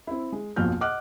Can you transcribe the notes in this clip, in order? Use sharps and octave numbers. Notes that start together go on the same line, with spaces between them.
C4 E4
G#3
A#1 F2 B2 F4 F6 G6
D#5 F#5 D6 F6 F#6